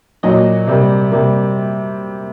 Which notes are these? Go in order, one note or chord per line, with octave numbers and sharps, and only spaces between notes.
A#2 F#3 A#3 D#5
C3 G3 A#3
C3 G3 A#3